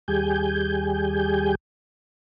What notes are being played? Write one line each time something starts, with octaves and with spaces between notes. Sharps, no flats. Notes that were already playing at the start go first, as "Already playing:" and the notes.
D#2 G3 G4 G#4 G#5 G6